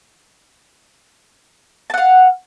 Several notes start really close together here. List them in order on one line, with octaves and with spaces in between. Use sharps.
A5 F#5 F5